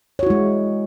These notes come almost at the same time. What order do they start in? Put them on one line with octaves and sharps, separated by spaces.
C#5 F#4 E4 G#3